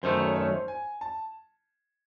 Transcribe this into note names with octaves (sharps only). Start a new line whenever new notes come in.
F#2 D#3 A3 C5
C#5
C#5
C5
G#5
A5